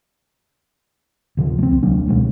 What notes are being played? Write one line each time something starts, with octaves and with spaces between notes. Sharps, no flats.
D2 C3 F3
A3 C4
C2
D2 F#3 A#3 D4
C#2 B2 G#3 A3